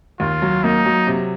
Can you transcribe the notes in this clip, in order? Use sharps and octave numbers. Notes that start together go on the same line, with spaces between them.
D#2 F4
F#3
A#3 D#4
F#3
C3